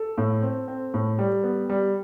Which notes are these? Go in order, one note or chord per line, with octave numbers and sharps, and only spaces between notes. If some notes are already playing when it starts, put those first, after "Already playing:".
Already playing: A4
A2
C4
C4
A2
G3
B3
G3